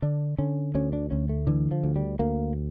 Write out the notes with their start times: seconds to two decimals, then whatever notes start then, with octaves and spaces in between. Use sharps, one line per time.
0.02 D3 D4
0.39 D3 C#4
0.75 D2 C#4
0.93 D4
1.11 D2 C#4
1.29 A3
1.47 D3 E3
1.71 F3
1.83 D2
1.96 G3
2.19 D2 A#3